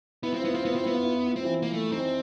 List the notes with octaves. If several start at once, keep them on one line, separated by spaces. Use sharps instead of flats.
B3 E4
C4 F4
B3 E4
C4 F4
B3 E4
C4 F4
B3 E4
F4
E4
F4
E4
C4 F4
E3 E4
A#3
A3
D#3 C4 D#4